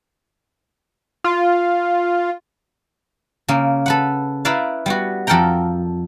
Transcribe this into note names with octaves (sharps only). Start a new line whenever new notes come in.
F4
C#3 A#3
A4 B4 F#5
E4 A#4 B4 D5 E5 F5
G3 B3 F#4
F2 A4 A#4 F#5 G5 A#5